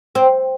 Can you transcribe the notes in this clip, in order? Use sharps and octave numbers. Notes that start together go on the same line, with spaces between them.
C4